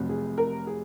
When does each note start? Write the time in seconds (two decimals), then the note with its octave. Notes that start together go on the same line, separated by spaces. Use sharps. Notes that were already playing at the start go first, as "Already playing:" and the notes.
Already playing: F1 F2 C3 F#3
0.09 G#4
0.38 A#4
0.67 G#4